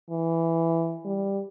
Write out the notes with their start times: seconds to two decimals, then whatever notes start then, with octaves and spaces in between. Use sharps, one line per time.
0.10 E3
1.05 G3